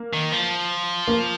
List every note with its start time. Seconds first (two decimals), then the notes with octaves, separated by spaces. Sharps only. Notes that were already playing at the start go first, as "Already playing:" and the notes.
Already playing: A#3
0.13 D#3
0.32 F3
1.08 A#3